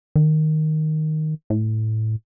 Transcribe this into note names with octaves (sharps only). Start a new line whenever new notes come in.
D#3
A2